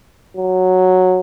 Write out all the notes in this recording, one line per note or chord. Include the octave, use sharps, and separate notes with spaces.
F#3